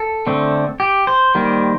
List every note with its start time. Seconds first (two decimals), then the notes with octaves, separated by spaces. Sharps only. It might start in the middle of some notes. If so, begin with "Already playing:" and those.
Already playing: A4
0.27 D3 A3 C4
0.80 G4
1.07 C5
1.35 D#3 G3 A#3